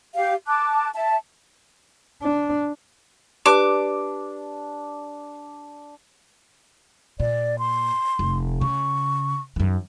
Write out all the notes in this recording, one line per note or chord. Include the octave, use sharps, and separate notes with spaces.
G4 F5
A5 D6 F#6
E5 A5
D4
D4 G4 B4 D6
A#2 D5
C6
F1
C#3 C#6
F#2 D#3